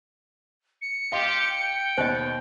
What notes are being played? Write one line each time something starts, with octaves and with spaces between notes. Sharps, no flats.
C#7
F3 G4 D#5 F5 C6
G5
D#2 B2 C5 D#5